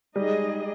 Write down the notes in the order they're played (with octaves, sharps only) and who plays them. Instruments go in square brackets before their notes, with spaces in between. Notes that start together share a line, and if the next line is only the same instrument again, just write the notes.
[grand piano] G3 [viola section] G#3 D#4 G#4 D#5